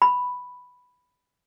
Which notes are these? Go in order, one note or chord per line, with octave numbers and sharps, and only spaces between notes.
B5